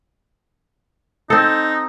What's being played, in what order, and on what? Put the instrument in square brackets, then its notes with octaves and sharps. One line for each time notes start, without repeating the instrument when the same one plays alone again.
[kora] C4 A4 [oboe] D#4